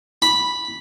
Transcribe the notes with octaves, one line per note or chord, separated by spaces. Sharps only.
B5